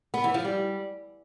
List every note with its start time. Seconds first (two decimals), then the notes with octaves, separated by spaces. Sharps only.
0.14 B3
0.24 E3
0.34 F3
0.45 G3